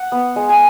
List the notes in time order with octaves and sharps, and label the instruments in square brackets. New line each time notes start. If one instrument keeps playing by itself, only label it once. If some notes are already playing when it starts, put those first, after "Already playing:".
Already playing: [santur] F#5
B3
G#3
G#5